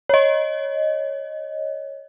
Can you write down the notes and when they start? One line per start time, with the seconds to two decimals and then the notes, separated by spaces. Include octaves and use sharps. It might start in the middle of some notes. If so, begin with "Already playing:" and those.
0.09 C#5 D#5